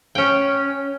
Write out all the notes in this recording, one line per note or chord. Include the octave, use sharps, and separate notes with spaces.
C#4 G5